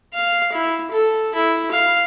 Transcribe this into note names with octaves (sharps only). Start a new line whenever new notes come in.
F5
E4
A4
E4
F5